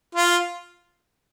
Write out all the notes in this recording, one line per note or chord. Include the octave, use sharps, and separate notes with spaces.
F4